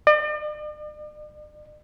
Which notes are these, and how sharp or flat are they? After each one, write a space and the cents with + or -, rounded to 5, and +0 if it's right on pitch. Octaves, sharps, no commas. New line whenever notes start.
D5 +45